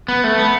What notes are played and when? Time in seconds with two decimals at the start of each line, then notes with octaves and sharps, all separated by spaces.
0.08 B3
0.24 A3
0.38 B3